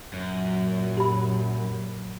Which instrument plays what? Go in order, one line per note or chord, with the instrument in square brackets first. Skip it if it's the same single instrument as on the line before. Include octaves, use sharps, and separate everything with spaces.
[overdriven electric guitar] F#2 [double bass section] A#2 F#3
[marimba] G4 B5